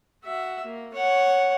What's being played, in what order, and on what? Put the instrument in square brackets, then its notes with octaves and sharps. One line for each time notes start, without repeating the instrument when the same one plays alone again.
[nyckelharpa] F#4 E5
A#3
C#5 F#5